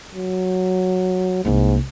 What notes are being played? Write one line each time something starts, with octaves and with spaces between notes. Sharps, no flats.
F#3
C2 G#2 A#3